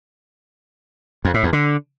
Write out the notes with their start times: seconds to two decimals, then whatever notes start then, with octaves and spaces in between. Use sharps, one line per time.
1.25 F2
1.34 A2
1.43 E2
1.53 D3